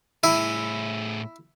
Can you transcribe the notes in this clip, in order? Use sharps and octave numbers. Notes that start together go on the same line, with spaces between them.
A2 E4 G#4